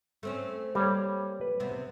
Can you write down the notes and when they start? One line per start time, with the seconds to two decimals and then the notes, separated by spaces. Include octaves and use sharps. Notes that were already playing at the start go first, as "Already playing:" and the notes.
0.23 A3 C4 C#4
0.75 G3 A#3 C#5
1.41 B4
1.60 C3 B3